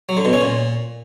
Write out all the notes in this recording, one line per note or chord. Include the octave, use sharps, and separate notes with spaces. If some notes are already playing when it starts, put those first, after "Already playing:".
F#3
D3
B2
C#4
A#2